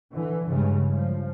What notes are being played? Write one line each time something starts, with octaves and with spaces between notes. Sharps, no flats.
D3 E3
G2 C#3 G#3
F3